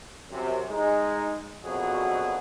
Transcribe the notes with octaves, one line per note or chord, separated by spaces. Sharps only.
F#2 C3
G#3 D#4
A#1 F2 B2 F#3 F#4 G#4